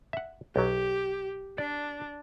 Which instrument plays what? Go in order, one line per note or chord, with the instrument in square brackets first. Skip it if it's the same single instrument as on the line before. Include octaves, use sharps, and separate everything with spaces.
[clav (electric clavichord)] E5 F#5
[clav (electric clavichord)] B1 F#3 [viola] G4
[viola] D4 [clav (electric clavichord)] D5